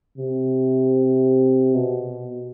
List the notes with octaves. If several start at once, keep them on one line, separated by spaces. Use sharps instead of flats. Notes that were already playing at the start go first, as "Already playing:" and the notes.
C3
B2